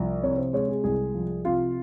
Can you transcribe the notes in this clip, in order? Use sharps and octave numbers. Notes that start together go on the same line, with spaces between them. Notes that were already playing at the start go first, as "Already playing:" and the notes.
Already playing: C2 F3
C3 C#5
C5
G#3 C#5
G#4
C2 G#4
F3
C3 F4